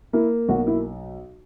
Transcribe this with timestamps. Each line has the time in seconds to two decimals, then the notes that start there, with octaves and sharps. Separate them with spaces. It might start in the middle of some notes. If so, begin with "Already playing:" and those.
0.13 A#3 E4
0.48 B1 F#4
0.67 E4